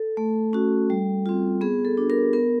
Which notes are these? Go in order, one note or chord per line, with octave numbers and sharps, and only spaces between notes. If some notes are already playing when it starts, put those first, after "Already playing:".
Already playing: A4
A3
C#4 F#4
G3
C4 F4
B3 G#4
A4
D4 F#4
A#4
B3 A#4